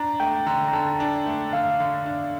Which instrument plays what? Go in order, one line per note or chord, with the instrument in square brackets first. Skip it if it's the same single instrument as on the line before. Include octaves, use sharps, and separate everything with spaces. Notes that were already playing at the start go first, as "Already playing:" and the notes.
Already playing: [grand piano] D4 [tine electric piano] A#5
[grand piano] A3 [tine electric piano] G5
[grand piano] D3 [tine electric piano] A#5
[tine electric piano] A#5
[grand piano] D3 [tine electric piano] A5
[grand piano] D4
A3
[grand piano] D3 [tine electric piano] F5
[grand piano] D3
D4